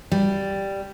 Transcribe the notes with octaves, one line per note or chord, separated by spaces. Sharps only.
G3